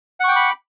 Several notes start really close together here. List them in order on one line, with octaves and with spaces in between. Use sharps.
F#5 C#6 G5 D6 B5